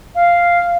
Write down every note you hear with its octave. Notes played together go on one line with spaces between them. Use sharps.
F5